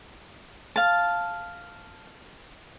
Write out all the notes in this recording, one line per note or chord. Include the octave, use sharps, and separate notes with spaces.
F5 A5